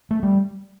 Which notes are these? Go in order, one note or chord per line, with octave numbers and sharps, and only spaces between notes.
A3
G3